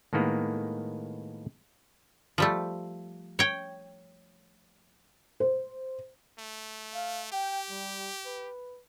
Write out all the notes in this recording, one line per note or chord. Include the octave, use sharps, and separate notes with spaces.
A2 D#3 G#3 A#3 B3
F3 G3 A3
C#5 G5
C5
A3
F5
G4 G5
G3
B4